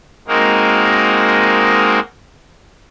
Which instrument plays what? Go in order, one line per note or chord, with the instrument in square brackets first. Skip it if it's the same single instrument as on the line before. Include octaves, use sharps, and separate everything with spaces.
[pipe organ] G#3 A#3 C4 D#4 F#4 A#4